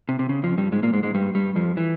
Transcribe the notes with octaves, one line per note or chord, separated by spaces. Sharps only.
C3
C3
C#3
F2 F3
G2 G3
G#2 G#3
A#2 A#3
G#2 G#3
G#2 G#3
G2 G3
G2 G3
F2 F3
E3